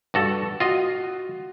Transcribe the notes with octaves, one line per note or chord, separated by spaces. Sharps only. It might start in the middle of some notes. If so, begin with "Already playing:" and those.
G2 F#4 A4
F4 F#4 D#5